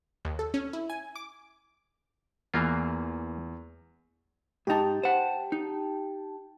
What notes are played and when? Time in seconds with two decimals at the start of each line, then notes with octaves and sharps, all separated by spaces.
0.25 D#2
0.39 A4
0.54 C#4
0.73 E4
0.90 G#5
1.15 D6
2.54 E2 E3 A#3 F4
4.67 G#2 D#4 G4 G5 A5
5.03 C5 F#5
5.52 D#4